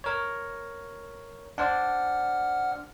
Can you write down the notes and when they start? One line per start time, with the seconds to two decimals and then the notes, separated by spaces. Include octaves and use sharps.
0.04 A#4 C#5
1.58 D4 C5 D5 F#5 F6